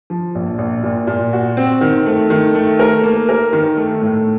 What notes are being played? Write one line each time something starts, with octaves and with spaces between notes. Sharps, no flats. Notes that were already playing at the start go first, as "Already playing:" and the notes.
F3
A#1
A#1
A#2
A#2
F#4
C4
D#3
A3
D#3
A3
A#4
A#3
A#4
D#3
A3
A2